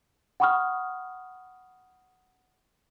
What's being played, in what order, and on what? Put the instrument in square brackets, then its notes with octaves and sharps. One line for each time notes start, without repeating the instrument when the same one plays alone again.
[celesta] F#5 G5 B5 C#6 D#6 F6